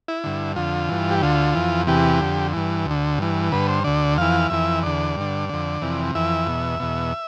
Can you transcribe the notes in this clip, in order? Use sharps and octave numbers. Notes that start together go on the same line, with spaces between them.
E4
G2 D3
F2 D3 F4
G2 E3
G4
D2 D3 F4
F2 E3
E2 C3 E3 G4
F2 D3
G2 E3
D2 D3
G2 E3
G2 D3 B4
C5
D2 D3 D5
F2 E3 F5
F2 E3 E5
E2 D3 D5
G2 D3
F2 D3
F2 C3 E3
F2 E3 E5
E2 B2
E2 B2